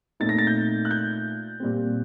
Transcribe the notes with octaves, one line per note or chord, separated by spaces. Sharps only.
A#2 A3 C4 D#4 A6
A#6
A6
G6
F#6
G6
A#2 G3 C4